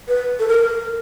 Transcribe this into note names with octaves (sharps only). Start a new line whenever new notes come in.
B4
A4
A#4